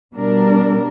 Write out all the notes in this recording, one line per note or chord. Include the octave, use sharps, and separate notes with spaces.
B2 G3 D4 A#4